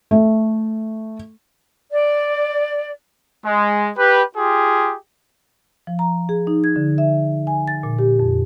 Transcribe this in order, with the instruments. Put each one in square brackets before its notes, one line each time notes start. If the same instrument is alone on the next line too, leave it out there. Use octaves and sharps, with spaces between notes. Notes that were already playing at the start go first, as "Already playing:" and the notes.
[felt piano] A3
[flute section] D5
[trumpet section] G#3
G4 B4
F4 G4 G#4
[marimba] F3
A#5
G#4
D#4
G#6
D3
E5
G#5
A6
A#2
G4
F2